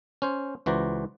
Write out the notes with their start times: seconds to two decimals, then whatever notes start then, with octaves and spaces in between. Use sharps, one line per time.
0.22 C#4 C5 C#5
0.66 C#2 E3 F#4 C5 D5 A#5